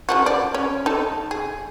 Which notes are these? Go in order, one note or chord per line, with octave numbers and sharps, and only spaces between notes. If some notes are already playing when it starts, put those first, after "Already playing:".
C#3 F3 F#4
D5
C#4
D#4 A4
G#4